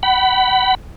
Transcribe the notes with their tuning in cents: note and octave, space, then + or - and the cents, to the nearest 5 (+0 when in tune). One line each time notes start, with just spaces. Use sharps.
F#5 +35 B5 +0